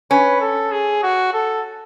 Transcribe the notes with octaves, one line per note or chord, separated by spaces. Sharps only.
C#4 B4
A4
G#4
F#4
A4